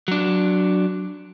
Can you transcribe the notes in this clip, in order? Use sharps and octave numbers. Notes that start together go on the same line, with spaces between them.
F#3 D4